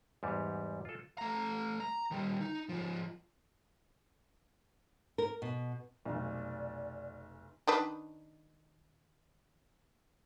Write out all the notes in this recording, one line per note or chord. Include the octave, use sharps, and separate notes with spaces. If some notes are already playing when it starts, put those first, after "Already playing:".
E2 G#2 G3
F4 A4
A3 A#5
A#5
D#3 G3
D#4
G#2 F3
A#4
B2
F1 B1 D5
D#3 D4 B4